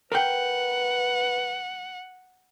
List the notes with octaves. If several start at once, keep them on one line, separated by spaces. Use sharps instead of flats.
A#4 B4 F#5 G5